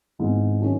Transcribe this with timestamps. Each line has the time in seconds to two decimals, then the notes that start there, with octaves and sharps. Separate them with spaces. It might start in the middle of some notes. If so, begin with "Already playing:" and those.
0.19 G#1 G#2 E3 B3
0.61 D#3 F#3 C#4 E4 G#4